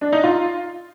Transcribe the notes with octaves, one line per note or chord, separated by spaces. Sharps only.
D4
D#4
F4